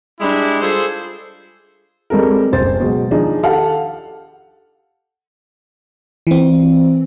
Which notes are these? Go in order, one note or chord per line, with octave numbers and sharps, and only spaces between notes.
G3 G#3 D4 E4
F4 G#4 A4 C5
G3 G#3 C4 A4 A#4
F#1 C5 A6
B2 F#3 G#3
D#3 F3 D4 D#4 G#4
G4 A4 F5 F#5 A5
E3 C4